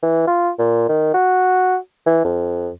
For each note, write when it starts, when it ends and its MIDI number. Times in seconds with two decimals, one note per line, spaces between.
0.03 0.26 52
0.27 0.51 65
0.59 0.89 46
0.89 1.12 51
1.14 1.77 66
2.06 2.23 52
2.25 2.71 41